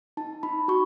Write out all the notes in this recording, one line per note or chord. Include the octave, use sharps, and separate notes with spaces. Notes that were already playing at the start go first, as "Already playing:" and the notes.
D#4 A5
D#4 B5
F#4 C#6